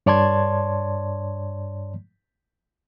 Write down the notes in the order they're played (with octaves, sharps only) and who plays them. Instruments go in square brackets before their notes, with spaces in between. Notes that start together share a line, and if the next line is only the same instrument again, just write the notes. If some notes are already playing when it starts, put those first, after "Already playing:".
[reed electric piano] G2 C#5 D5 A5 C6 G#6